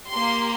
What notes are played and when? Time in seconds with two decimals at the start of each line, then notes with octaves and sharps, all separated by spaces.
0.11 A#3 G4 C6